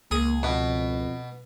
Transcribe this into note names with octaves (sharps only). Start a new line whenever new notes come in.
C#2 A#3 G#4
F2 B2